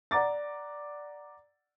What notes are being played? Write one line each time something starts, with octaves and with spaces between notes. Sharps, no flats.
D5 F#5 A#5 D6 A6